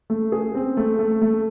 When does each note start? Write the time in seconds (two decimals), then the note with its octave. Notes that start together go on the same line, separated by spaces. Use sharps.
0.10 A3
0.32 G#4
0.55 C4
0.77 A3
0.99 A3
1.22 A3